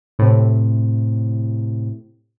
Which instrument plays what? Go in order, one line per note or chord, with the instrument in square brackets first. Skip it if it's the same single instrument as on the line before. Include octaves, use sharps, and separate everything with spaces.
[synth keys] A2 C3